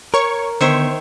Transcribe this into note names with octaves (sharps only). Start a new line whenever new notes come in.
A#4 C#5 C#6
D3 D#3 B3 C5 C#5 E5